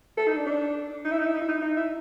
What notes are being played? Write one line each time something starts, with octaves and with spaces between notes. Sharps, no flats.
A4
D#4
D4
D4
D#4
E4
D#4
E4
D#4
E4
D#4
D#4
E4